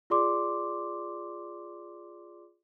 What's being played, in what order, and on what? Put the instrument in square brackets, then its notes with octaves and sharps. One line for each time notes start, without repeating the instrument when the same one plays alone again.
[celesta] F4 G#4 D5 C6 D6